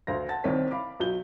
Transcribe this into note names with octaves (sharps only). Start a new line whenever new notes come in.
D2 F5 A#6
F#5 A5 A6
C2 D#3 C4 C#5 B6
F5 B5 D6
B1 F#3 G6 G7